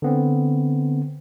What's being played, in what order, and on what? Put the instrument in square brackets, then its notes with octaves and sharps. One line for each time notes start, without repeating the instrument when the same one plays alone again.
[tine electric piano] D3 B3 C4